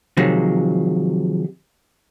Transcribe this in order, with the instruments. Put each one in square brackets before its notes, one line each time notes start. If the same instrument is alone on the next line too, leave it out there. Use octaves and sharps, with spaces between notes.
[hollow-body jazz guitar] C3 D#3 F3 F#3 G#3